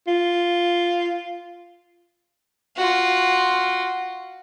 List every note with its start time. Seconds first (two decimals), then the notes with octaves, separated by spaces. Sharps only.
0.07 F4
2.76 F4 F#4